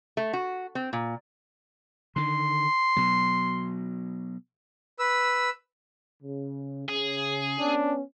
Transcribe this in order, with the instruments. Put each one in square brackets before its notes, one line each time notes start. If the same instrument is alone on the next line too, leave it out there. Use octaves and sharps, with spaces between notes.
[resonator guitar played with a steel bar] A3
F#4
C4
A#2
[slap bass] D3 D#3 [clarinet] C6
[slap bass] B2 F#3
[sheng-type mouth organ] B4 E6
[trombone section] C#3
[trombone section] C#3 [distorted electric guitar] G#4
[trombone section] B3 C#4 [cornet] D4